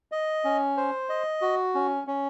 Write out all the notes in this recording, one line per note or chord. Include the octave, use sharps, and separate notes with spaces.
D#5
C#4
C5
D#5
F#4
C#4
C#4